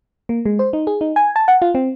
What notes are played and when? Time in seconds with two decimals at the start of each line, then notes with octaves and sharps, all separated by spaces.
0.29 A#3
0.46 G#3
0.59 C5
0.73 D#4
0.87 G#4
1.01 D#4
1.16 G#5
1.36 A5
1.48 F#5
1.62 F4
1.75 C4